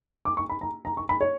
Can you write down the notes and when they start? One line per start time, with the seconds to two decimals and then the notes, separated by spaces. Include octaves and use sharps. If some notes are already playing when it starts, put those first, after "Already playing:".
0.25 D6
0.37 C#6
0.49 B5
0.61 A#5
0.85 A#5
0.97 C#6
1.09 B5
1.21 C#5